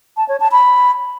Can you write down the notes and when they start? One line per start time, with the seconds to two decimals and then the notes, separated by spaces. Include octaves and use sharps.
0.17 A5
0.28 C#5
0.40 A5
0.52 B5